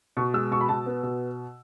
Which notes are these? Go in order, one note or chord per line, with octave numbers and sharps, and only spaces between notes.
B2 C#6
G#3 E6
B2 C#6
B5
B2 A5
B3
B2